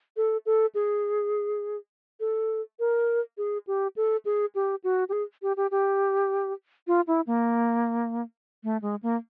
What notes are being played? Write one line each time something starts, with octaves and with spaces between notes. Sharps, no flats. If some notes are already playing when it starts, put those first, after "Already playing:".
A4
A4
G#4
A4
A#4
G#4
G4
A4
G#4
G4
F#4
G4
G#4
G4
G4
G4
F4
E4
A#3
A3
G#3
A#3